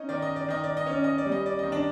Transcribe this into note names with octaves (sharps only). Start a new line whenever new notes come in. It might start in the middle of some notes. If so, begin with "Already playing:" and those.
Already playing: C#4 D#4 D#5
D#3 D5
D#5
D5
D#3 D#5
D5
D#5
C#4 D5
D#5
D5
G3
D#5
D5
D#3 D#5
D4 D5